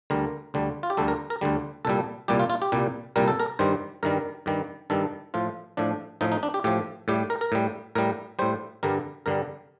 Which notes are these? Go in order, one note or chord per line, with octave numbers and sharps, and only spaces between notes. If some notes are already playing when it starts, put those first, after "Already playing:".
D2 D3 G3 A#4
D2 D3 G3
F4
G4
D2 D3 G3 A4
A#4
A#4
D2 D3 G3
C2 A#2 G3 A4
C2 A#2 G3 G4
F4
F4
G4
C2 A#2 G3
C2 A#2 G3 A#4
A4
A#4
G2 D#3 G3 C5
G2 D#3 G3 A#4
G2 D#3 G3
G2 D#3 G3 A4
A2 F3 F4
A2 F3 D4
A2 F3 D#4
D#4
D4
G4
A2 F3 G4
A2 G3 G4
A#4
A#4
A2 G3
A2 G3 A#4
A2 G3 C5
G2 D3 G3 A#4
G2 D3 G3 A#4